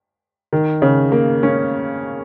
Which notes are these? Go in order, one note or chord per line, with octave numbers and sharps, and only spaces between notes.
D#3
C#3
A#3
C#4